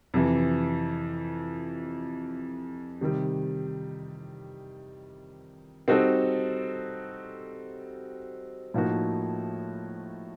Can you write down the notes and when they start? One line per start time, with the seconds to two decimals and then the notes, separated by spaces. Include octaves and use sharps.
0.14 F2 C3 E3
3.01 C3 D#3 G3
5.88 G3 C4 D#4 F#4 A4
8.74 A2 F3 A#3 D#4 F#4